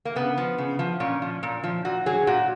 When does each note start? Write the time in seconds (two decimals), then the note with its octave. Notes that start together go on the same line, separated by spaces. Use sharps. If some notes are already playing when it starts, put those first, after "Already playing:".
0.05 A#3
0.16 C#3 B3
0.38 F3
0.58 C#3
0.79 F3
1.00 A#2 C#4
1.22 F3
1.43 A#2
1.64 F3
1.85 A#2 F#4
2.06 F#3 G#4
2.27 A#2 F#4